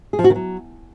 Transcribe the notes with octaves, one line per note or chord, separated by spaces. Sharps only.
G#4
F3
F#4
D#3
F#3